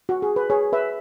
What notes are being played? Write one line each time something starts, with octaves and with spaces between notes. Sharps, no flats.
F#4
G#4
B4
G#4 C#5
B4 E5